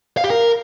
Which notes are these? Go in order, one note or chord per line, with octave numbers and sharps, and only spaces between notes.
F5
G4
A#4